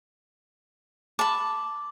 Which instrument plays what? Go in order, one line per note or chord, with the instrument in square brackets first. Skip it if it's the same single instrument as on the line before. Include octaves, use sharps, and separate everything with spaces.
[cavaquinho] A5 B5 [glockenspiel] D6